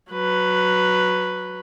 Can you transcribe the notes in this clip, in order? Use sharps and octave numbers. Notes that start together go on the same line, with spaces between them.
F#3 B4